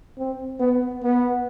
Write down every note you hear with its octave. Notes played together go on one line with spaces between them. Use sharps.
C4
B3
B3